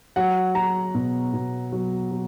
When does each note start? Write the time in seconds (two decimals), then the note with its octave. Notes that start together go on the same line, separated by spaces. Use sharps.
0.16 F#3 F#5
0.55 F#3 A#5
0.95 B2
1.34 B2
1.72 F#3
2.11 F#3